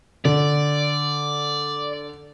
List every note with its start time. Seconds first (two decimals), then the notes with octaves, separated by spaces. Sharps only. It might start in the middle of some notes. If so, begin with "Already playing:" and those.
0.25 D3 D5